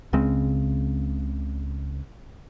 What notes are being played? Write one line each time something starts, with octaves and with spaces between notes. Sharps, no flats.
C#2 C#3 G#3 C4